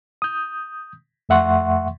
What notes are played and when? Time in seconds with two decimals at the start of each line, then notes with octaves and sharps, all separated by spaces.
0.22 D#6 G6
1.29 F2 A3 E5 F#5 C6 C#6